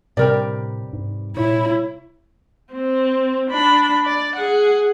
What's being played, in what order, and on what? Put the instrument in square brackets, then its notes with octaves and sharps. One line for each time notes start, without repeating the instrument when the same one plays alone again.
[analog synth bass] A2 [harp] C3 G3 B4 [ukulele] G4 A#4 D5
[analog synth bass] G#2
[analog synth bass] A#2 [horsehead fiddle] E4 [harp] C#5
[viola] C4
D4 B5
D5
G#4 F#5